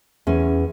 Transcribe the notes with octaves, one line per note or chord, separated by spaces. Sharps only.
E2 C#4